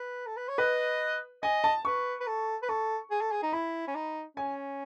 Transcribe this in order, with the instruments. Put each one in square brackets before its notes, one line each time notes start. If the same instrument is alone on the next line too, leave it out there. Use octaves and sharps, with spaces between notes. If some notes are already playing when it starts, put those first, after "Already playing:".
Already playing: [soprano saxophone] B4
A4
B4
C#5
[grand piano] B4 [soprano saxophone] D#5
[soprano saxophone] D#5 [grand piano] G#5
[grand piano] A5
[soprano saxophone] B4 [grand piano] C#6
[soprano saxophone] B4
A4
B4
[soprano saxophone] A4 [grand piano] C#6
[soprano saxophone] G#4
A4
G#4
D#4
[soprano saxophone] E4 [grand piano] B5
[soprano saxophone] C#4
D#4
[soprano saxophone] C#4 [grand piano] G#5